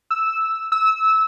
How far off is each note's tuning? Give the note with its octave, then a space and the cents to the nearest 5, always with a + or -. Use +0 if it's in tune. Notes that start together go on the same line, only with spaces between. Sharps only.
E6 -5
E6 -20